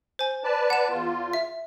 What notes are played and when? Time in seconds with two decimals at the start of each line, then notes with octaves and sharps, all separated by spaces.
0.19 C5 G#5
0.44 B4 D5 A5
0.70 F#5 E7
0.90 E2 F4
1.33 E5